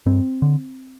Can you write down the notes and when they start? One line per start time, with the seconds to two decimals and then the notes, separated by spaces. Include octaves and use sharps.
0.06 G2 C4
0.42 D3